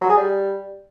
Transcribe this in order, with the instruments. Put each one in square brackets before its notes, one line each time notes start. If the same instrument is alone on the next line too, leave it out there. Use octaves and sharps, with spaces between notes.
[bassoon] F#3
G#4
G3